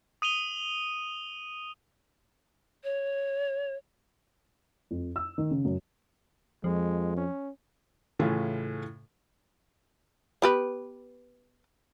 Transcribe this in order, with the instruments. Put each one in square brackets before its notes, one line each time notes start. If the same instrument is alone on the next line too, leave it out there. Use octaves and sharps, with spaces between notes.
[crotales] D#6 D#7 F7 G7
[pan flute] C#5
[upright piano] F2
E6
D#3
C#3
F#2
[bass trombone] F2 [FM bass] F3 [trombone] G#3
[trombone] C#4
[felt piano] A2 C#3 E3 A3 C#4 F4
[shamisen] B3 G4 B4